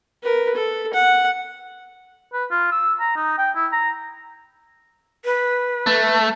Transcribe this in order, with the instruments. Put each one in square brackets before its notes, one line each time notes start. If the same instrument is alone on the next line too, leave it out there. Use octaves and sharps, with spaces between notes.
[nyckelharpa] A#4 B4
A4
F#5
[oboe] B4
F4
E6
A#5
D#4
G5
E4
A#5
[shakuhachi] B4
[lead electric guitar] A3